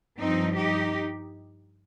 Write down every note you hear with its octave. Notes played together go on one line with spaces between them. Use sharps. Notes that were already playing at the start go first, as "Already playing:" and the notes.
G2 F3 C4 D#4
D#4 G4